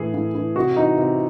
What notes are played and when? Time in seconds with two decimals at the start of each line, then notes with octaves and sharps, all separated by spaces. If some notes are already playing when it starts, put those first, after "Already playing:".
Already playing: A2 E3 G#4
0.14 A2
0.35 E3
0.55 C3 F#4
0.76 E3 D#4
0.98 C3